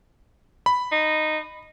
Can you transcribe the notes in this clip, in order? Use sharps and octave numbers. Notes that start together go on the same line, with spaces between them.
B5
D#4